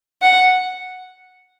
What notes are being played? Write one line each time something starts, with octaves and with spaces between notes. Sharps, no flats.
F#5